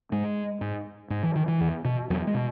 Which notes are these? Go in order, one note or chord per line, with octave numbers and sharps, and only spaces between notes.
G#2 G#3
G#2
G#2
E3
D#3
E3
E2
B2
E2 F#3
G#3
B2